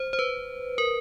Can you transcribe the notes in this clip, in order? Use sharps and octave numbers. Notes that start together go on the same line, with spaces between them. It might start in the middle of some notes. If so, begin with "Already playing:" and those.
Already playing: C5
C5
B4
A#4